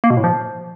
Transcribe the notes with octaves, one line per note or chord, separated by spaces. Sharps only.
A#3
B2
A2
F3